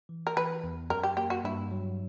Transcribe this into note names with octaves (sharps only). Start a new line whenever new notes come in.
E3
A#4
E3 B4
E2
F#2 A#4
G4
A#3 G4
F#4
G2 E4
F#3